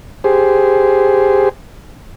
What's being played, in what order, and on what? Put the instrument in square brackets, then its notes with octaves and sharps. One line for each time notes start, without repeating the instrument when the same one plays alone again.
[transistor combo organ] G4 G#4 C5